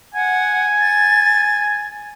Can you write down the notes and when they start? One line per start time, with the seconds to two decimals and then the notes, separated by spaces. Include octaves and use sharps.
0.14 F#5 G#5
0.79 A6